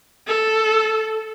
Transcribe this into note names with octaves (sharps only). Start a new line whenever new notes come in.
A4